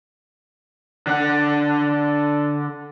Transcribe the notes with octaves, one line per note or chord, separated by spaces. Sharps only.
D3 F#5